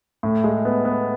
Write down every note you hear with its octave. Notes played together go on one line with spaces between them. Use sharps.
A2
G#3
B3
B3